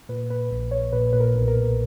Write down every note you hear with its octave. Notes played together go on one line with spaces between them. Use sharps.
A#2 B4
A#2 B4
A#1 B4
A#1 C#5
A#2 B4
A#2 B4
A#4
B1
A#4
B1